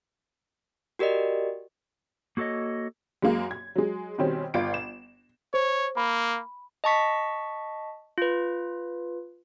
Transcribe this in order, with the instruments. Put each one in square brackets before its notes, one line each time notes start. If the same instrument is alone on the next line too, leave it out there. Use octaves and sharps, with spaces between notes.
[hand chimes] F#4 G4 A#4 D5 D#5
[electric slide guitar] A#3 F#4 A4 C#5 D#5
[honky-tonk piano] F#2 G#3 A#3
G#6
F#3 G#3
B2 D#3 G3 C4 C#4
G1 F4 D7
E7
[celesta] C5 [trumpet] C#5
[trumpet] A#3 [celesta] B5
[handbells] D#5 A5 C#6 B6
F4 B4